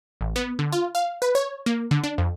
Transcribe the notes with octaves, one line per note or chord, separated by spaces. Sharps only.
A1
B3
D3
F4
F5
B4
C#5
A#3
D3
D4
F2